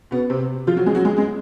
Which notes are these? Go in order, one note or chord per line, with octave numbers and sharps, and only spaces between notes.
B2 B3
C3 C4
F3 F4
F#3 F#4
G#3 G#4
F#3 F#4
G#3 G#4
G#3 G#4